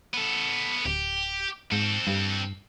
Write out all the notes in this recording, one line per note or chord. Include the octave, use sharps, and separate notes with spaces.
B3 A4
D1 G4
G#2 C4 A4
G2